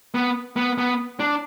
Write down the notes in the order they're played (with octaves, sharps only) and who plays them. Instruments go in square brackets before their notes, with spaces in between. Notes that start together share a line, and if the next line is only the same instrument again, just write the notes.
[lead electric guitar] B3
B3
B3
D4